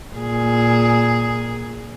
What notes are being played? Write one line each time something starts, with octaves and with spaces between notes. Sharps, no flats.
A#2 G#4